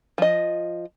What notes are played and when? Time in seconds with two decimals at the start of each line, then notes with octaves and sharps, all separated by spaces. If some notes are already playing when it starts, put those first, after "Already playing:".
0.18 F3 D#5